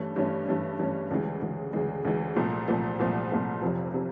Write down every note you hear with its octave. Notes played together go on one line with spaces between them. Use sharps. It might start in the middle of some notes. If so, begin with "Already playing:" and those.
Already playing: G2 E3 A3 C#4
G2 E3 A3 C#4
G2 E3 A3 C#4
G2 E3 A3 C#4
D2 C#3 E3 G#3
D2 C#3 E3 G#3
D2 C#3 E3 G#3
D2 C#3 E3 G#3
C2 A#2 F3 A3
C2 A#2 F3 A3
C2 A#2 F3 A3
C2 A#2 F3 A3
F1 F2 C3 F3
C3 F3